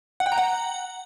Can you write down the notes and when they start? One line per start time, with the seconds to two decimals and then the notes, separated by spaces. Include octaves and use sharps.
0.20 F#5
0.26 G5
0.32 A#5
0.38 F#5